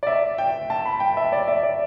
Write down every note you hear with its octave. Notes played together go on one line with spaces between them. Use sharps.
D5
E5
G5
A5
B5
G5
E5
D5
E5
D5